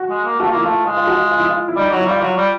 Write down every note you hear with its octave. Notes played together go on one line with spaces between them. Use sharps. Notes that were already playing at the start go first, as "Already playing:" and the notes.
Already playing: F#4
G#3
A#3
A3 F#4
F4
A#3
E4
A3 F4
G#3 F4
F4
F#4
F4
F4
E4
F4
E4
G3 D#4
F#3 D#4
E4
G3 F4
F#3 F4
G3